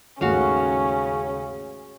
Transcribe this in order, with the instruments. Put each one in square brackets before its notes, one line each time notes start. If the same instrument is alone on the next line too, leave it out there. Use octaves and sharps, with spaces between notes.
[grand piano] D#2 G#2 A3 [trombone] C#3 [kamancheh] C#4 [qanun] F#4 F5